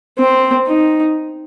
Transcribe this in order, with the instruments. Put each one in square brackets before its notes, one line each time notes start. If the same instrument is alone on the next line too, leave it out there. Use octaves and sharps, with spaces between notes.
[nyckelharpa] C4
D#4